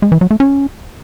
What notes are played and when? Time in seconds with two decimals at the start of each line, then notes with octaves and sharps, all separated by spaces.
0.02 G#3
0.12 E3
0.21 F#3
0.31 A3
0.40 C#4